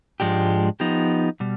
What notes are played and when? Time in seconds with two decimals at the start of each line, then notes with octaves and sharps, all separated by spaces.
0.20 G#2 F3 G#3 D4 G4
0.80 F3 B3 D#4 G4
1.40 B2 G3